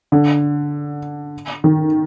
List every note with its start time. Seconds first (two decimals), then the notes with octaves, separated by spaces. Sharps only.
0.12 D3
1.64 D#3